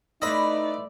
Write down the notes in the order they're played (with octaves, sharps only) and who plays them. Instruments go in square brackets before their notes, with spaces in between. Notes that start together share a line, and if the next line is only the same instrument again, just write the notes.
[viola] A3 D5 [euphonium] D#4 [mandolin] E4 B4 C5 [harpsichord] D#5 B5